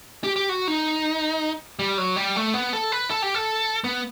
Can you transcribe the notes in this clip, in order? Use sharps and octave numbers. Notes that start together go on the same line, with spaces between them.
G4
G4
F#4
D#4
G3
F#3
G3
A3
B3
A4
B4
A4
G4
A4
B3